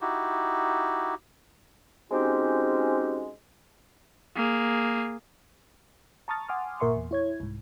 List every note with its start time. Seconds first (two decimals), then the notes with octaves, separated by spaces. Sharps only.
0.01 D#4 E4 F#4 G4
2.11 G#3 C4 C#4 D#4 F#4 G4
4.36 A#3 G#4
6.28 A5 A#5 C#6 D#6 F6 A6
6.48 F#5 G#5 C6 D6 D#6 F6
6.80 G1 A#2 A#4 E5 C6 C#6
6.96 E2
7.11 E4 C#5 G#6
7.40 C2 G#2